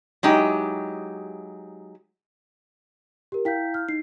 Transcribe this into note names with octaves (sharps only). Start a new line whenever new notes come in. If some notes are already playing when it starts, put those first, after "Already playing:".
F#3 G#3 D#4 E4 G4
G4 A#4
E4 F5 G5 G6 B6
F6
D#4 C7